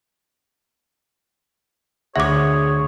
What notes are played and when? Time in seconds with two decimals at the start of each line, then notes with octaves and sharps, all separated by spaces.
2.16 D2 G#4 C#5 E5 F#5 D6